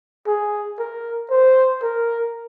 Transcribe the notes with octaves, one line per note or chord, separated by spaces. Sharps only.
G#4
A#4
C5
A#4